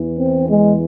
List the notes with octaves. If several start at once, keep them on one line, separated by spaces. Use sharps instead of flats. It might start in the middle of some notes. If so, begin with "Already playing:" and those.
Already playing: E2 E3
C4
G#3